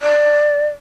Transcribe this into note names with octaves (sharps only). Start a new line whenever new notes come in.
D5